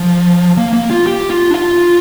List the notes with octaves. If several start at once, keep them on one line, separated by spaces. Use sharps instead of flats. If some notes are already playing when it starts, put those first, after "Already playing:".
Already playing: F3
A#3
A#3
F4
G4
F4
D4
F4